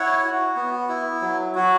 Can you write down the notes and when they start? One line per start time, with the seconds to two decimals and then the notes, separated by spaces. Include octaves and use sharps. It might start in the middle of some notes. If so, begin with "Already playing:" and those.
Already playing: E4 C#5 F#5
0.24 F#4
0.56 B3
0.89 E4
1.22 F#3
1.55 F#3 F#4